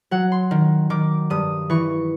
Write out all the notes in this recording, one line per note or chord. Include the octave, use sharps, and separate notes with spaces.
F#3 F#5
C6
D#3
D#3 D6
G2 D#6
E3 C#6